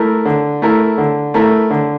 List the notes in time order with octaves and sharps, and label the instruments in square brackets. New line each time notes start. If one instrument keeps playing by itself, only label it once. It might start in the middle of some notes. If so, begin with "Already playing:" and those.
Already playing: [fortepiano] A3 E4 A#4
D3
A3 E4 A#4
D3
A3 E4 A#4
D3